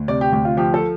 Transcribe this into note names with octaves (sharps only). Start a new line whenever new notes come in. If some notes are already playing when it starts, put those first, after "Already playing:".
Already playing: D2
C3 D5
G4
D2 G4
F4
F3 G4
A4